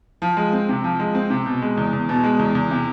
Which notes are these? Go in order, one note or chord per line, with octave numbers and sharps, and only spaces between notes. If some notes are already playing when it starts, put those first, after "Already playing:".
F3
G#3
C4
C3
F3
G#3
C4
C3
B2
G#3
E2
E2
B2
G#3
E2
E2
C3